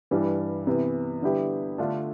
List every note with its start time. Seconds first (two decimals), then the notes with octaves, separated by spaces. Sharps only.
0.11 G2 E3 G3
0.67 C3 E3 B3
1.22 D3 G3 B3 E4 G4
1.78 D3 A3 D4 F4 A4